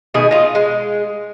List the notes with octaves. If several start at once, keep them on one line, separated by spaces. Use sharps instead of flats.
B2 D#3 A3 G#4
D#4 F4
G#3